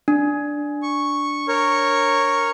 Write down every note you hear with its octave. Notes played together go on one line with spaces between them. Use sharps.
D4
C#6
A#4 C#5 C#6